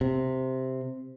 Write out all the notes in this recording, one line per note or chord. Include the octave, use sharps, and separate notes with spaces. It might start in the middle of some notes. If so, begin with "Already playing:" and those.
C3